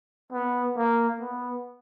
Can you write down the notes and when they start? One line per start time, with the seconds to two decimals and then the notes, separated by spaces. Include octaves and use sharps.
0.32 B3
0.77 A#3
1.20 B3